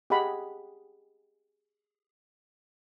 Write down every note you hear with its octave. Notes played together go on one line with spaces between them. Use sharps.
G4 G#4 D#5 F#5 B5